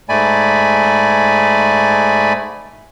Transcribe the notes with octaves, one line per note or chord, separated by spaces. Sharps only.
G#2 A3 D5 G#5 B5